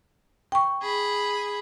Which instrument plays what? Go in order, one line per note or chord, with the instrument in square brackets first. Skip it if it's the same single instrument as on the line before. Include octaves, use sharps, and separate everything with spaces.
[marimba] G5 C#6
[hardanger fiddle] G#4 B5